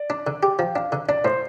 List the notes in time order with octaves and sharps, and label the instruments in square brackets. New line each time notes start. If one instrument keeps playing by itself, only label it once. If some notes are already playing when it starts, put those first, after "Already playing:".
Already playing: [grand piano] D5
[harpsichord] D4
D3
G4
[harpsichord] F3 [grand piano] G5
[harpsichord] D4 [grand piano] F5
[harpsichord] D3
[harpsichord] D4 [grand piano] D5
[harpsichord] A2 [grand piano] C5